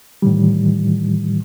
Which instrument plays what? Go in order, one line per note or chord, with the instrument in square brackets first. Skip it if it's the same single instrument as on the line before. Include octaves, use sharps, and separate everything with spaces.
[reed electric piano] A2 D#3 E3 G3